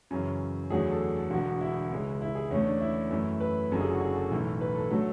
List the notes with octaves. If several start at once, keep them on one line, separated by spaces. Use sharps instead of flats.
F#2 C#3 E3
E2 D3 F#3 A3 G#4
A4
A4
E1 E2 D3 F#4
E4
C#2 C#3 G#3
E4
G#4
E2 D3 A3 C#4
D4
E4
F#2 E3 A3
B4
F#1 F#2 D3 A4
G#4
F#4
G#4
A4
B1 A2 E3
B4
A4
D3 F#3 A3 A4